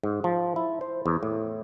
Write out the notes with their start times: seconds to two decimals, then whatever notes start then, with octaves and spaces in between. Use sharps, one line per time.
0.03 G#2
0.24 F3
0.56 E4
0.81 C5
1.06 E2
1.23 A2